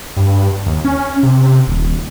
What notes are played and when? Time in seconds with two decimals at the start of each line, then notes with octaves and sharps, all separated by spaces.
0.17 G2
0.66 D#2
0.85 C#4
1.23 C3
1.67 D#1